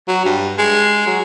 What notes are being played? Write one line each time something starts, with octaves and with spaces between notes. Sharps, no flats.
F#3
G2
G#3
F#3